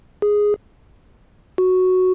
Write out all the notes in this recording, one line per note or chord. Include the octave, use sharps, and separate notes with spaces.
G#4
F#4